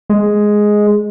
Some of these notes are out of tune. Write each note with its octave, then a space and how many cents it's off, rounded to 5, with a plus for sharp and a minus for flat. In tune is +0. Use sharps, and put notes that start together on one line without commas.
G#3 +5